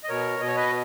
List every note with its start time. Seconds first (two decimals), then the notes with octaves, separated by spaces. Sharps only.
0.04 D#5
0.09 B2 A#4 C#5
0.40 B2 D#5
0.48 C#5
0.56 B4 D#5